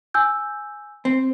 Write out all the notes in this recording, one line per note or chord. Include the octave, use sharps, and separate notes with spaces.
G#5 E6 G6
C4